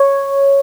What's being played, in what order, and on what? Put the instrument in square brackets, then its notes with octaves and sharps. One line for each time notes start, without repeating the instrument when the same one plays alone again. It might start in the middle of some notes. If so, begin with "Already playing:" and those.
Already playing: [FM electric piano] C#5